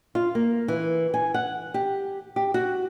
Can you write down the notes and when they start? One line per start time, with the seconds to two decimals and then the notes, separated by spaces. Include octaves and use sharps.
0.15 F4
0.35 A#3
0.68 E3
1.14 G#5
1.34 F#5
1.74 G4
2.36 G4
2.54 F#4